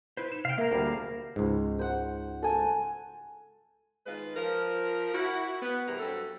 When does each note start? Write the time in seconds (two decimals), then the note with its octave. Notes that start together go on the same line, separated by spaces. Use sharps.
0.17 E4 B4 C5
0.32 D#4 E7
0.45 C3 F5 G5
0.58 A#3 A#4 E5 F5 A#5
0.71 D2 G3 A#3 G#4
1.36 C#2 G#2
1.79 C5 F#5
2.43 A4 G#5
4.06 D#3 G#3 F4 B4
4.35 F3 A#4
5.13 E4 F#4
5.62 B3
5.87 E2 G2 C3 A#4
6.00 G2 F#3 C4 A4